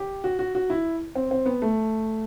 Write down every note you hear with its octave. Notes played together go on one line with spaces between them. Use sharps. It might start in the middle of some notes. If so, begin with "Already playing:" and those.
Already playing: G4
F#4
F#4
F#4
E4
C4
C4
B3
A3